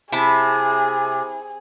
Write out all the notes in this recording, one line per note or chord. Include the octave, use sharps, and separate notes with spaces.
C3 E4 G#4 A5 B5